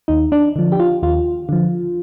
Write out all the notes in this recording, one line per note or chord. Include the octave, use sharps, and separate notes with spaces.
D#2 D#4
D4
D3 F3
G4
F4
D#2 F4
D3 F3